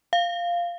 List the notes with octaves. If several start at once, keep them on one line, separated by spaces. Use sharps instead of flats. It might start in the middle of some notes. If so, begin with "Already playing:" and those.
F5